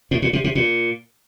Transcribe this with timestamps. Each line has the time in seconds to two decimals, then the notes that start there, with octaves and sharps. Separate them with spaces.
0.11 A2
0.22 A#2
0.33 C3
0.44 C3
0.55 A#2